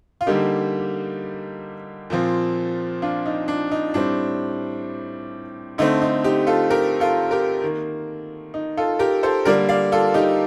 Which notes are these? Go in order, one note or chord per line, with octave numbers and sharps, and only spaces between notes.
F4
D3 G3 A#3 D#4 G4
A#2 F3 C4
D4 F4
D#4
D4
D#4
A2 G3 C4 D4
D3 A3 C4 D#4
D#4
D#4 G4
F4 A4
G4 A#4
F4 A4
G4 A#4
D#3 A#3
D#4
F4 A4
G4 A#4
A4 C5
D3 G3 A#3 A#4 D5
D5 F5
F4 A4
D#4 G4